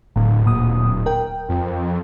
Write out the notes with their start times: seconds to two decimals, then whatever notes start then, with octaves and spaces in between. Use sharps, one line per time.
0.16 D1 A2
0.46 A#2 D#6
1.06 A#4 G5
1.49 F2